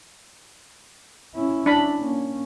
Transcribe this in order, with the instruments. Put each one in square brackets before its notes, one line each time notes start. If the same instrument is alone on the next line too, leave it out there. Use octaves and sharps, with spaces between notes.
[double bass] C#4 E4
[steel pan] D4 B5
[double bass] A#3 C#4